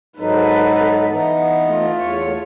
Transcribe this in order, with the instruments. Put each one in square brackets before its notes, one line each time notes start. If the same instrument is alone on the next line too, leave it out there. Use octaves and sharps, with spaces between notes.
[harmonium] G#2 F#3 D#4 [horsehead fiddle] A4 B4
[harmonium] E3 B3 D#4
[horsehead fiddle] A3 F4
[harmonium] E2 C#5